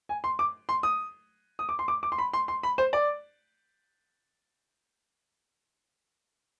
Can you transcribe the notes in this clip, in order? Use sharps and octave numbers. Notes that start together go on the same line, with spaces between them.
G#5
C6
D6
C6
D#6
D#6
D6
C6
D6
D6
C6
B5
C6
C6
B5
C5
D5